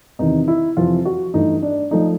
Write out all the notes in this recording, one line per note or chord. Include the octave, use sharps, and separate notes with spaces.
E2 C3 D#3 D#4
E4
F2 C3 E3 F4
F#4
G2 E3 A3 D#4
D4
F3 A3 D#4